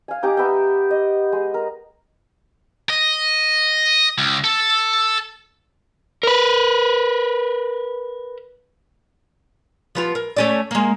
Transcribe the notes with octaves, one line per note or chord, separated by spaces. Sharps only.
F5 G#5
D#4 G4 A#5 D6
B3 E5 G5
D#5
G#3
A#4
D#5
C#2
A4
A#4 B4
F3 B3 F4
A#4
A3 C#4 D5
G#3 A#3